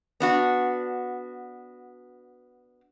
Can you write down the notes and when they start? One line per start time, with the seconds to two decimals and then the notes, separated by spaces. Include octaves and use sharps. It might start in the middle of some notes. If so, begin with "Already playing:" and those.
0.20 B3 D4 F#4